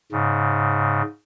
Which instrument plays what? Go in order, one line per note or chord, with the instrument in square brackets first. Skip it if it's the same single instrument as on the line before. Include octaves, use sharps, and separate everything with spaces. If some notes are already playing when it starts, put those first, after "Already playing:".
[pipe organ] G#2 C#3